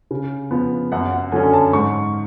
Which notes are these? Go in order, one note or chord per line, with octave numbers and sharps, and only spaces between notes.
C#3
F3 B3
F#2 F#5
F#5
D3 F#3 C#4 G#5
G#5
A5
G#2 C#6